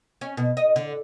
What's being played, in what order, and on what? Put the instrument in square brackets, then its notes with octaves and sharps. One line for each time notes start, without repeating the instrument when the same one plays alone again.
[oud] C#4
B2
D#5
D3